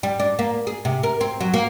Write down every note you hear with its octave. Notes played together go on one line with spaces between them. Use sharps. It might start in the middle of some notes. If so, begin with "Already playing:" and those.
G3
D4
A#3
G#4
C3
A#4
C4
F#3
A#3